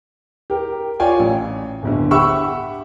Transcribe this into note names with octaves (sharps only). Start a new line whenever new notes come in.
G4 A#4
F4 C#5 D5 F5 G5 G#5
A1
D1 G1 D3
G4 E5 F#5 B5 C#6 E6